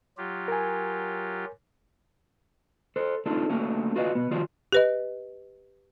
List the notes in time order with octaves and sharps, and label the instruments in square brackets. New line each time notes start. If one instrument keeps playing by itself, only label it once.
[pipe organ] F#3 F4 G4
[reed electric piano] A#4 G#5
[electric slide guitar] A4 C5
C4 D4 D#4 F4 A4
F#3 A3 A#3 C#4 D4
F4 F#4 B4 D5 D#5 F5
B2 B3
D#3 F3 F4 F#4 D5
[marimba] G4 B4 D#5